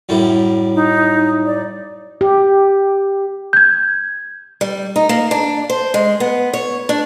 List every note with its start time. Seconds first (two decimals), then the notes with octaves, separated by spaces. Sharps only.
0.09 F#2 A2 G3
0.75 D#4
1.46 D5
2.21 G4
3.53 G6 G#6
4.61 G3
4.96 D#4
5.09 A#3
5.31 D4
5.70 C5
5.94 G#3
6.20 B3
6.53 C#5
6.89 D4